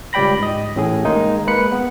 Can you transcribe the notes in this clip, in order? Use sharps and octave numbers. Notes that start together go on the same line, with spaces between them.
C#2 G3 D5 G5 B5 A#6
G#2 D#5
A1 A2 G#4
D#3 G#3 A#3 D#4
G#3 A#3 B4 B5 C#7
B3